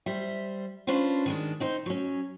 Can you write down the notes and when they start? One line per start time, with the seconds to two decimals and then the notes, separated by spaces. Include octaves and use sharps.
0.06 G3 C5 E5
0.87 C#4 D4 F4 B4 C5
1.26 D#3 G#3 D4
1.60 C4 D#4 C5
1.86 F#3 C#4